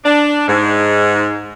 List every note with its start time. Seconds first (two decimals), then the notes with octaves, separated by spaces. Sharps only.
0.05 D4
0.48 G#2